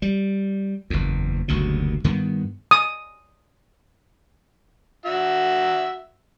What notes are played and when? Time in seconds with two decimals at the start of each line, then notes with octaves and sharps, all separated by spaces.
0.02 G3
0.90 F#1 E2
1.48 F#1 D2 G2 B2
2.04 G2 D#3 B3
2.71 D#6
5.06 F#4 E5